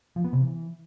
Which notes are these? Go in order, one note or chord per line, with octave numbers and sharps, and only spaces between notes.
F3
B3
C3
E3